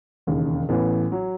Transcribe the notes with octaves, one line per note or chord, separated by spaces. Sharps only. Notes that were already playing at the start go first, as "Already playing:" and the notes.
E1 D#2 C#3
A1 A2 E3 B3
F#3